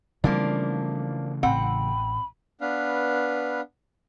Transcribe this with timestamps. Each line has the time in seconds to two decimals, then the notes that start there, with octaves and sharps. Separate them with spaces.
0.24 C#3 E3 F3 G3 A3 A#3 C4 D4
1.43 A1 C4 F#5 G5 B5
2.61 B3 D4 B4 F5